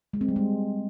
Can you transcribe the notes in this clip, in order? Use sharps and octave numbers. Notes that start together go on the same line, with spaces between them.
G#3
C4
G3
G#3